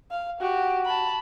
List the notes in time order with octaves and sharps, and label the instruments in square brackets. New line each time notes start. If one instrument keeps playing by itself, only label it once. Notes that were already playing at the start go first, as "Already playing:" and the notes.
[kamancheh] F5
[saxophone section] F#4 [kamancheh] G4
[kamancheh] A5 B5